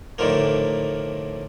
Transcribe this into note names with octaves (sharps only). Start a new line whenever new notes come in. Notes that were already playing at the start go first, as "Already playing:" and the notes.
A2 D3 D#3 F3 A#3